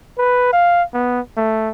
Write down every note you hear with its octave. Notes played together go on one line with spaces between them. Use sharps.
B4
F5
B3
A3